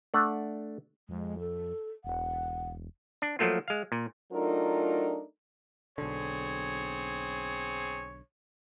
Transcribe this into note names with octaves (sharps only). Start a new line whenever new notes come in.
A3 D4 F#5
F2 G#3
A4
E1 F#5
D4
F3 F#3 A3 A#3 F4
G#3 F5
A#2
F#3 A3 D4 D#4 F4 A#4
B1 D3 C4 G#4 C#5